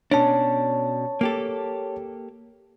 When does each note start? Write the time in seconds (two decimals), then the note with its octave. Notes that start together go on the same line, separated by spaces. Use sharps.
0.11 B2 C#4 D4 C#5 A5
1.21 A#3 G4 A4